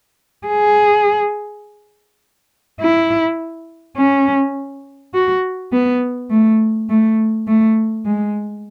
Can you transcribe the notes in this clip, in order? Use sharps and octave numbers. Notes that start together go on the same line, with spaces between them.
G#4
E4
C#4
F#4
B3
A3
A3
A3
G#3